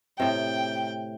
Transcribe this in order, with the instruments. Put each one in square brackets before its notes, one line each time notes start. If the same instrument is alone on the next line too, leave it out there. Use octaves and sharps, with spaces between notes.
[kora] A2 C3 [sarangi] G5